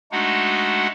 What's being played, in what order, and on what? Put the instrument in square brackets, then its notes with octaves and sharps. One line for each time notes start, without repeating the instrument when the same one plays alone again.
[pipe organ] G#3 A3 D4 D#4 F#4 F#5